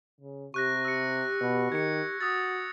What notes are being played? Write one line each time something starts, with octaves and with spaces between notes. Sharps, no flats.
C#3
C3 G4 C#6 F#6 A#6
G4 E6 C#7
B2
D#3 G#6 C#7
F#4 D#6 E6 A6